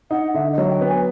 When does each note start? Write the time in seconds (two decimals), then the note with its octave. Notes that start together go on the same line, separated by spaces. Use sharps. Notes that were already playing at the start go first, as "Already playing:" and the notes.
0.11 D#4 F#5
0.34 D3 E5
0.52 D#5
0.58 F#3
0.70 G5
0.81 B3
0.87 G#5